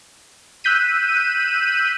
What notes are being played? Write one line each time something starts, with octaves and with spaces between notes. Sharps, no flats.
E6 F#6 G6 B6 D#7